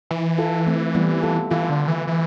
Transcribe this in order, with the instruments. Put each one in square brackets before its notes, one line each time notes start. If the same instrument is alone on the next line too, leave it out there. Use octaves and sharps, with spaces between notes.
[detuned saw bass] E3
[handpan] F4 A4
A3 C4
G3 B3
F4 A4
[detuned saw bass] E3 [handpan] F4 A4
[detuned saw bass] D3
E3
E3